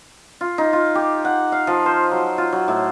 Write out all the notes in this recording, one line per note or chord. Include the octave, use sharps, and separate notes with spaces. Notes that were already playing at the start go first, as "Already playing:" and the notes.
F4
D#4
F4
G4
F#5
F5
F3
C5
F#3
F4
F#3
A2